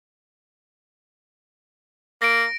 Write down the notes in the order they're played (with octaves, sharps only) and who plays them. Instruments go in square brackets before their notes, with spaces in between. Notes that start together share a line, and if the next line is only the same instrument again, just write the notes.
[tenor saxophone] A#3 [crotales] A#6 D7